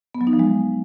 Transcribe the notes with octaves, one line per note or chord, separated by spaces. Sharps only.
B3
F#3
D#4
F3
G#3